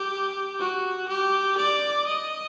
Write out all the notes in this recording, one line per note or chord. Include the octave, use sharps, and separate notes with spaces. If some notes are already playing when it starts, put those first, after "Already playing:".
Already playing: G4
F#4
G4
D5
D#5